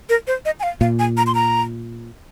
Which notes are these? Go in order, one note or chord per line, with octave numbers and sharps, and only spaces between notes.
A#4
C5
D#5
G#5
F5
A#2 F5
G#5
A#5
C6
A#5